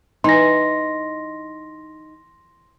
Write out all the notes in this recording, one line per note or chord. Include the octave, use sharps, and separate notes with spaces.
E3 D#4 C6 A#6